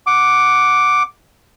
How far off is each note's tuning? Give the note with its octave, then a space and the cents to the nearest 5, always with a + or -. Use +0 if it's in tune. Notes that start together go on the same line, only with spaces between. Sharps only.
F#5 +0 D6 +0